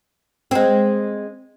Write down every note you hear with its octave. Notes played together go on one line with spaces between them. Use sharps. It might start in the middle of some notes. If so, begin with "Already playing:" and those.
G#3 C4